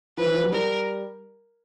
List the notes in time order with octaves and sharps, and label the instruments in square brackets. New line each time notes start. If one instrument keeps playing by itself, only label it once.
[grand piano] F3 [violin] B4
[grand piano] E3
F3
F#3
[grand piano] G3 [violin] A#4